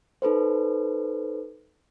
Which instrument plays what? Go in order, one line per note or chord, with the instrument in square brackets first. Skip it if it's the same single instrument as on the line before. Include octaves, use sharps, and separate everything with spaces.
[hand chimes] D#4 A4 B4 C5